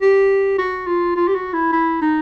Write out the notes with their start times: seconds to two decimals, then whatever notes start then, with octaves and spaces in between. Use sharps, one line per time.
0.02 G4
0.58 F#4
0.87 F4
1.16 F4
1.28 G4
1.35 F#4
1.53 E4
1.73 E4
2.02 D#4